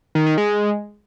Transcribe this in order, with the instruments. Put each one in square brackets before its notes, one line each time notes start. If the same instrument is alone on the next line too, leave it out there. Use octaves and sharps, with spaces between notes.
[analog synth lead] D#3
D#3
G#3